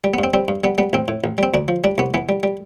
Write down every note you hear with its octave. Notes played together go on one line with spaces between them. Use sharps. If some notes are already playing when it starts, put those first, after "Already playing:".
G3
B3
G2 C4
G3 C4
G2
G3 B3
G3 B3
A1 C4
A2
A1
G3 C4
D2 D4
F3
G3 D4
C2 B3
E3 B3
G3
G3